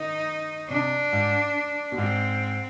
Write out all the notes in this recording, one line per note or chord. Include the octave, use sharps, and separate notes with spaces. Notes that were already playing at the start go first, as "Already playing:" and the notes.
Already playing: D#3 D#4
C3 D4
G#2
B2
G#2 C4